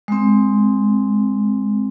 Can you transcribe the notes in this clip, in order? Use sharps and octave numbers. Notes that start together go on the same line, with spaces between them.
G#3 C4